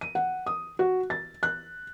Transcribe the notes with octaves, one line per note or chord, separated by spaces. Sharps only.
D#7
F#5
D#6
F#4
A6
F#6